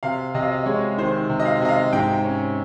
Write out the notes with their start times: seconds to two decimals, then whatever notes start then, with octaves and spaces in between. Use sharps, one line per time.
0.03 C3 F5
0.34 C3 D#5
0.43 F5
0.52 D#5
0.66 G#3 C#5
0.98 D#3 C5
1.29 C3
1.40 D#5
1.45 F5
1.61 C3 D#5
1.69 F5
1.93 G#2 G5
2.24 C#4